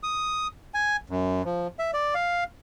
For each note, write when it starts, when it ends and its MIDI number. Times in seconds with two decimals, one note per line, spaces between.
0.03 0.47 87
0.74 0.97 80
1.10 1.42 42
1.45 1.67 53
1.79 1.91 76
1.94 2.14 74
2.15 2.44 77